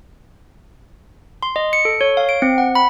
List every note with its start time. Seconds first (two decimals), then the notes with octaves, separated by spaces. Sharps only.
1.43 C6
1.56 D#5
1.73 C#7
1.85 A4
2.01 C#5
2.17 F5
2.29 D7
2.42 C4
2.58 F#5
2.75 B5